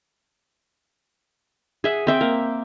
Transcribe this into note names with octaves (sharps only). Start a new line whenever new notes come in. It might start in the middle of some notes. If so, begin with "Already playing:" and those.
G#4 E5 F#5
C4 E5 G5
A#3